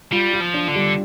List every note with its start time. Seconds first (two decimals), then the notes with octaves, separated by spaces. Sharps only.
0.12 G3 F4
0.33 F4
0.41 F3
0.54 D4
0.68 D3
0.75 G3